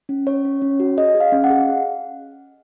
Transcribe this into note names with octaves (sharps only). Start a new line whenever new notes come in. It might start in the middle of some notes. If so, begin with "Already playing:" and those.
C#4
C#4 C#5
C#4
C#4
F#4
G#4 D#5
G#4
F5
C#4
F#5
G#4